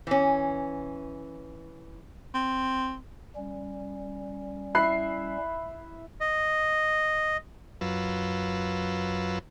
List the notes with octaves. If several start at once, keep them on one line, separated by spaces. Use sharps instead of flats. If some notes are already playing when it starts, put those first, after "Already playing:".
E3 C#4
C4
G3 C#4
E4 E5 B5 F#6 C7
D#5
F#2 F#3 F4 B4 E6